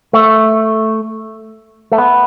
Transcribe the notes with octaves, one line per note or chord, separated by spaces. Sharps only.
A3
A3
B3